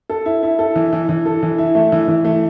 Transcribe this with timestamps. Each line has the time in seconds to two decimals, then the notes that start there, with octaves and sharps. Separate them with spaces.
0.10 A4
0.26 E4
0.43 E4
0.59 A4
0.76 E3
0.93 E3
1.09 E3
1.26 A4
1.43 E3
1.58 E4
1.75 A3
1.92 E3
2.08 E3
2.25 A3